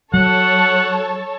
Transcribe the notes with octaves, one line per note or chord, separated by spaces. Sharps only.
F#3 A4 C#5 F#5 A5